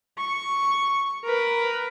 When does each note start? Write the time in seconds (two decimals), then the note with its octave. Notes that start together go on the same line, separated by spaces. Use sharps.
0.18 C#6
1.25 A#4 B4